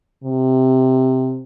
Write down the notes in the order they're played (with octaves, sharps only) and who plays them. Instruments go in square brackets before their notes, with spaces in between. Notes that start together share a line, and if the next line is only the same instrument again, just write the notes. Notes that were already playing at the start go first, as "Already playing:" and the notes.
[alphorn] C3